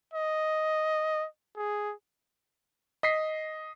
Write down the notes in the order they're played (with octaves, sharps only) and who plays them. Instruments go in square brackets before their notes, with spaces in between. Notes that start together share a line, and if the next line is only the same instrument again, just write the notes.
[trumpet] D#5
G#4
[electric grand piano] D#5 B6 C7